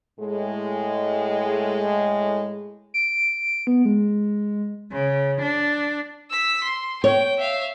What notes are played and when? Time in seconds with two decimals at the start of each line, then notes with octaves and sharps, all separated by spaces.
0.19 A2 G#3
2.94 D7
3.67 B3
3.85 G#3
4.91 C#3
5.42 D4
6.31 E6 B6
6.64 C6
7.04 C#5 G5
7.38 E5 F5